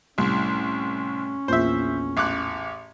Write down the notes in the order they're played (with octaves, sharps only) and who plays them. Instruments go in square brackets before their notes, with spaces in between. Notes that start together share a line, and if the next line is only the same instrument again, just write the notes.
[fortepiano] C2 [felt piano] A2 G3 [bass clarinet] C#4
[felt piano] A#1 E2 A#2 [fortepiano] C5 E5
[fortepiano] A1 D6 F#6